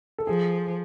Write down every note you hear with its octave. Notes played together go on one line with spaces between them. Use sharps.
A4
F3 G#4